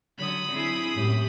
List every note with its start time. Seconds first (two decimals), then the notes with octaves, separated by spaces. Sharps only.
0.18 D3 F#3 B5 D#6
0.51 C4 E4 G#4
0.95 F#2 A2 G4